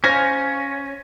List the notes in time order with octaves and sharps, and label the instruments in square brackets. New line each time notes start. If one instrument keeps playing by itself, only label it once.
[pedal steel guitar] C#4 [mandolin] C5 F5 G#5 [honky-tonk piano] G#6 A#6